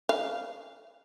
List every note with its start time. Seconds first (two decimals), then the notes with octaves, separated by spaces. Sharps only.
0.09 F5